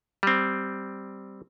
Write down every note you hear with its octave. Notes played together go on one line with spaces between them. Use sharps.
G3 C4